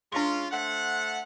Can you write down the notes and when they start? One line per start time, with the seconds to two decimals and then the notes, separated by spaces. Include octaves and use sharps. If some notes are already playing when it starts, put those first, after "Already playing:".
0.12 G#3 C#4 D4 F4 C6
0.52 A3 C5 F#5